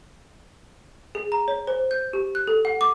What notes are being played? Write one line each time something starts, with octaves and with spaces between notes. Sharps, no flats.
G#4
A#5
C#5
C5
G6
G4
F#6
A4
F#5
D6